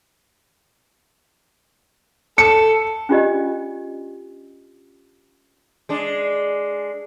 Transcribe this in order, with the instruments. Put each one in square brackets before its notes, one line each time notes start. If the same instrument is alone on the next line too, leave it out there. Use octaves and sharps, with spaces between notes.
[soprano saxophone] A4 [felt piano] C#7
[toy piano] C#4 D4 F4 G4 D5 D#5
[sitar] G#3 D4